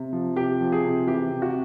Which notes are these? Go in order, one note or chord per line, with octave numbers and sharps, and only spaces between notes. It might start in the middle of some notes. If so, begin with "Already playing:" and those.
Already playing: C3
F3
C3 G4
F3
G#4
C3
E3 G4
C3
F#4